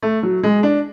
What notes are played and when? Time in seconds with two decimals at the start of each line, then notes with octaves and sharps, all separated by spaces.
0.03 A3
0.23 F#3
0.43 G#3
0.63 D4